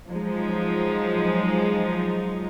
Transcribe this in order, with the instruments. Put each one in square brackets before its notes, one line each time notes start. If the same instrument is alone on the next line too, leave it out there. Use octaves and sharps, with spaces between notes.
[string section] F3 F#3 G#3 D#4